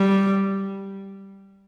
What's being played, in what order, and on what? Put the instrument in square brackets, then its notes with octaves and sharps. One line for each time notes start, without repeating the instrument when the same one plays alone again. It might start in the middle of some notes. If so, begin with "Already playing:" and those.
Already playing: [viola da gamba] G3